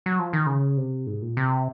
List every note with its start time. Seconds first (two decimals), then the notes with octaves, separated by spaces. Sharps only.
0.06 F#3
0.19 F3
0.33 D#3
0.46 C#3
0.77 C3
1.07 G#2
1.22 A#2
1.37 C3